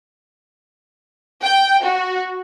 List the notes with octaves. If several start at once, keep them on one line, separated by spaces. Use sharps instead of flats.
G5
F#4